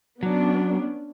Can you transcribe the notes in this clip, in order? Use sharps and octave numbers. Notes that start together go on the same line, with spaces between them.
F#3 B3 C#4 D4